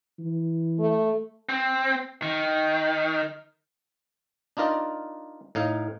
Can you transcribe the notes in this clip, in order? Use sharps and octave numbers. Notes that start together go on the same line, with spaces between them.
E3
A3
C4
D#3
D4 D#4 F4 A#4 D5 D#5
A2 D#4 F5